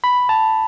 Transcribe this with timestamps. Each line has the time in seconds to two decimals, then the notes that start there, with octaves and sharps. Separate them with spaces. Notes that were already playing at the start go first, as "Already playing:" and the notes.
0.04 B5
0.29 A5